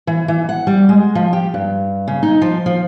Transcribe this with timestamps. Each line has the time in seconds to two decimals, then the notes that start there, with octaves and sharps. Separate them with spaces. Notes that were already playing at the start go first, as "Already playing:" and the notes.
0.07 E3
0.28 E3
0.49 F#5
0.67 G3
0.89 G#3
1.15 F3
1.33 G4
1.54 G2
2.08 C#3
2.23 D#4
2.42 F3
2.66 F3